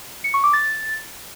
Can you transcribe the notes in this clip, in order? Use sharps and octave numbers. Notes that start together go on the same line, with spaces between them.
C#7
C#6
D6
A6